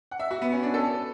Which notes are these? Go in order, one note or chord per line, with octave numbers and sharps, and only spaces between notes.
F#5
E5
F#4
B3
C#4
D4
A4